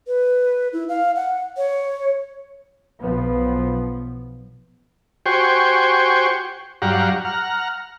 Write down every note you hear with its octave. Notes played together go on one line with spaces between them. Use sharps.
B4
E4
F5
F#5
C#5
B1 F3 B3
F#4 G4 C5 G5 G#5 C#6
G2 F#3 G4 F5 F#5 A#5
F#5 A#5 F6